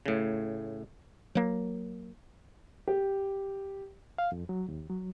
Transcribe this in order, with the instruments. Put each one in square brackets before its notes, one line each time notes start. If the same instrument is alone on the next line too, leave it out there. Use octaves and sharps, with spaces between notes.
[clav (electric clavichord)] A2 C#3
[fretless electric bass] F#3 A#3
[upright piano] G4
[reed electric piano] F5
F2
F#3
D#2
F#3